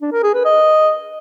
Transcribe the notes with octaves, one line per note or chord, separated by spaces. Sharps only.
D4
A#4
G#4
B4
D#5